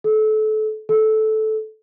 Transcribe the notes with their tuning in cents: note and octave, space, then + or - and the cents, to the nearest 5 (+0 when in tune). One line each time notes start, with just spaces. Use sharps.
A4 -30
A4 -15